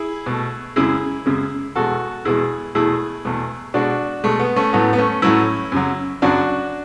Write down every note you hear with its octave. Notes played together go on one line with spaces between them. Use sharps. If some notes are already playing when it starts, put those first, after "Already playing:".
Already playing: E4 G#4
B2 A3
F#2 C#3 G#3 E4 G#4
F#2 C#3 G#3
E2 B2 G#3 F#4 A4
E2 B2 G#3 E4 G#4
E2 B2 A3 E4 G#4
E2 B2 A3
B2 G#3 D4 F#4
B2 G#3 A3
B3
A3 C#4
A2 F#3 A3 B3
B3
A3 C#4
A2 F#3 A3 C#4 E4
F#2 C#3 F#3
F#2 C#3 F#3 D4 F#4